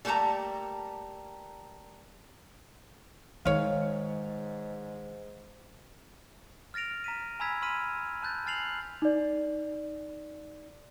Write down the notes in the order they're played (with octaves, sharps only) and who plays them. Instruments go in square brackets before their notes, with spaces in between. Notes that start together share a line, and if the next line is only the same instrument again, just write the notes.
[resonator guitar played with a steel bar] G3 A3 A#3 A5 A#5
[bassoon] G#2 [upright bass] D#3 G#3 [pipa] C#5 F5
[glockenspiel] F6 A6 A#6 D7 F7
A#5 B6 D#7
G#5 A#5 B5 E6 G#6 B6
B5 C6 F6 B6 D#7
A5 F#6 G6 A6
G#5 F6 A6 C7 F7 F#7
[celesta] D#4 D5